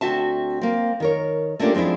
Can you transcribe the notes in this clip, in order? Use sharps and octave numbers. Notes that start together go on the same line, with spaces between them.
D2 C4 F#4 E5 A5
A#3 C4
D#3 A#4 C#5
A3 A#3 C#4 D4 F4 G4
F3 G#3 C4 D4 E4